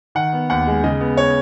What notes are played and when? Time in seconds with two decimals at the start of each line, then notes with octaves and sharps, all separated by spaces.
0.15 D#3 F#5
0.33 B3
0.50 D#2 F#5
0.67 G#3
0.84 C#3 D#5
1.01 B3
1.17 C#5